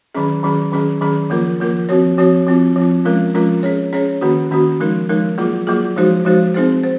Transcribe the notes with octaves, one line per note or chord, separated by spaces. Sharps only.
D#3 F#3 C#4 G#4
D#3 F#3 C#4 G#4
D#3 F#3 C#4 G#4
D#3 F#3 C#4 G#4
F3 A#3 F4 A#4
F3 A#3 F4 A#4
F3 C4 F#4 C#5
F3 C4 F#4 C#5
F3 C4 F4
F3 C4 F4
F3 G#3 C#4 F4 A#4
F3 G#3 C#4 F4 A#4
C#4 G#4 C#5
C#4 G#4 C#5
D#3 A#3 C#4 F#4
D#3 A#3 C#4 F#4
F3 G#3 D#4 A#4
F3 G#3 D#4 A#4
F#3 A#3 F4 G#4
F#3 A#3 F4 G#4
F3 G#3 D#4 F#4 C5
F3 G#3 D#4 F#4 C5
C4 D#4 G#4 C5
C5